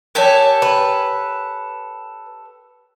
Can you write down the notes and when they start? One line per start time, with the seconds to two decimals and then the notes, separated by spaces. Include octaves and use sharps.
0.15 G4 A4 A#4 C#5 G#5
0.62 B4